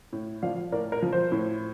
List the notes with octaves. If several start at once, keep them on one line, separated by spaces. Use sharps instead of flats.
A2
F3 D5 F5
A2 A#4 D5
A#4
F3
C5
A2